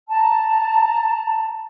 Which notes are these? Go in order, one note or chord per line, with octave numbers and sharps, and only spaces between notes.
A5 A#5